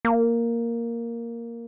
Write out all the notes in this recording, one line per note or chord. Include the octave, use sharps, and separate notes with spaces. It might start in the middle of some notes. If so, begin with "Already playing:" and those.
A#3